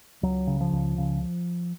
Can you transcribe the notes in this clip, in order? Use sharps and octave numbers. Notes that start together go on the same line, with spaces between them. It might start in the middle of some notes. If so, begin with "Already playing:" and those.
C#2 F#3
C#3
F3
C#2
C#3